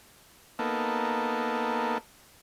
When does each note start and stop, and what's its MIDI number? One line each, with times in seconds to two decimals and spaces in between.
0.59 1.98 58
0.59 1.98 59
0.59 1.98 63
0.59 1.98 69